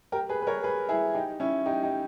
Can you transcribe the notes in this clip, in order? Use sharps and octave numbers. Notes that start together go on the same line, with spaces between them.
G4 A#4
G#4 B4
B4
A#4 C#5
G#4 B4
E4 G#4
D#4 G4
C#4 E4
D#4 G4
D#4 G4